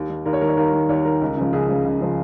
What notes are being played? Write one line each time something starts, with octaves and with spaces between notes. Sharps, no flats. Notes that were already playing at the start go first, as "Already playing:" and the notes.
Already playing: D#2
D#3
D#2 A#4
C#5
D#3 A#4
C#5
D#2 A#4
D#3
D#2 C#5
D#3 A#4
C#2
C#3 F3
C#2 G#4
C#3 F3
C#2
C#3 F3